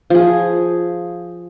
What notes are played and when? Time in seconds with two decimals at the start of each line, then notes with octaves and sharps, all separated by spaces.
0.10 F3 G#4